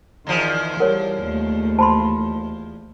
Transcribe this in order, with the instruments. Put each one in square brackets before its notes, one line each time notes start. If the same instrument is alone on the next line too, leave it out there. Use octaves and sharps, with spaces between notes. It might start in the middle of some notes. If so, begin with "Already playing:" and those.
[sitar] E2 F3 [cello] D#3
[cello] G3 [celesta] A#4 C#5 [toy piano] F#5
[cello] D#2 A3
[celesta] C5 [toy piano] A5 B5 C6